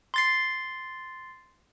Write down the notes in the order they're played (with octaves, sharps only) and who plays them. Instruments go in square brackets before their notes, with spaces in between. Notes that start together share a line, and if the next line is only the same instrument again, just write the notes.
[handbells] C6 A6 C7